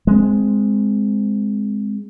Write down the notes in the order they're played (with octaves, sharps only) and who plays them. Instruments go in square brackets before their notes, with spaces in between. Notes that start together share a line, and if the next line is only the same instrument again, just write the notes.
[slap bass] G#3 C4